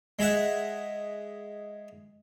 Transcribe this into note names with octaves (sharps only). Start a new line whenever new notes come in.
G#3 G#4 E5 F#5